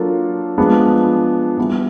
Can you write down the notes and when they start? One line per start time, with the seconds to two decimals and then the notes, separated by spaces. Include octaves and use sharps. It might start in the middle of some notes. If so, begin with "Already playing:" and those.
Already playing: F#3 A#3 D4 F4 A4
0.58 F3 G#3 B3 D4
1.57 E3 G3 B3 E4